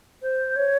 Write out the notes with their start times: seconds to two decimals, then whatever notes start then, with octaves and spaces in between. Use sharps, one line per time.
0.22 C5
0.56 C#5